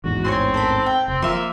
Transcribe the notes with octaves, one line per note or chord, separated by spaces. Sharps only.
A1 E2 G#2 F#4
C4 C#5 G#5 C6
A4 A#4 B5
G5
F1 C4
F3 A#3 E5 C6